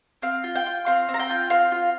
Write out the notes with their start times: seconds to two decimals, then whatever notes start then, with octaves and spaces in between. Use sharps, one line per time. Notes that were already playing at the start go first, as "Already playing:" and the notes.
0.22 C4 F5
0.44 F4
0.55 G5
0.66 F4
0.86 C4 F5
1.09 C4
1.14 A#5
1.19 G5
1.30 F4
1.50 C4 F5
1.72 F4